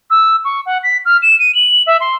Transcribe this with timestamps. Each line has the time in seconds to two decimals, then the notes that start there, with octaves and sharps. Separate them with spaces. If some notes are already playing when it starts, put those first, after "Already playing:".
0.10 E6
0.44 C#6
0.66 F#5
0.83 B6
1.05 F6
1.22 E7
1.39 D#7
1.54 F#7
1.86 E5
2.00 C6